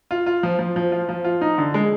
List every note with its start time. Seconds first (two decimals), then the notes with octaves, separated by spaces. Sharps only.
0.11 F4
0.26 F4
0.43 F3
0.59 F3
0.76 F3
0.92 F4
1.09 F3
1.24 F4
1.41 D#4
1.58 D3
1.74 G#3